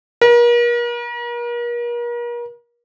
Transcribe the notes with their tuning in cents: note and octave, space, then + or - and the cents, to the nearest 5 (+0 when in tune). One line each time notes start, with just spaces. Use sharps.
A#4 +40